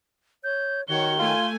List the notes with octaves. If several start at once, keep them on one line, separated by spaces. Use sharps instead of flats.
C#5 G6
D#3 F#4 C#5 G7
A3 F4 G#5